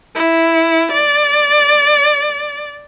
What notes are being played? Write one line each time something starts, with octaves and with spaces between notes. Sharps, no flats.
E4
D5